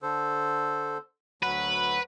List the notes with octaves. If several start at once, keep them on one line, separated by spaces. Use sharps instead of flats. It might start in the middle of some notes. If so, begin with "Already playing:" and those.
D3 A4 C5
D2 F#3 B4 F#5